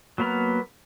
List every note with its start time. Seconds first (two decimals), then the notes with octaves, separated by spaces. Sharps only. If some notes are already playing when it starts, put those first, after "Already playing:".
0.18 F#3 A#3 B3 A#5 F6